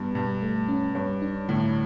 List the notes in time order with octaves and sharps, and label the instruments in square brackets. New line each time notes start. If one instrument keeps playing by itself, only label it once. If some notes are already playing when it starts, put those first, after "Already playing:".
Already playing: [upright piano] G2 [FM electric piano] B3
[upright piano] G2 [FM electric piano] B2
[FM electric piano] A3
C#4
[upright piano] G2 [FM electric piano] C#5
[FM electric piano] D4
[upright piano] A2 [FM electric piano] D3